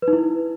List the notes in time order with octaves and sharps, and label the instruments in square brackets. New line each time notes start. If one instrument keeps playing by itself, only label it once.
[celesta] B4
D#4
E4